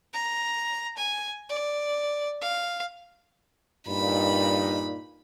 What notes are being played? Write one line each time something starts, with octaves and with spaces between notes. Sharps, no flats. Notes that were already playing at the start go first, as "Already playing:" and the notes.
A#5
G#5
D5
F5
G2 A#2 D#4 B5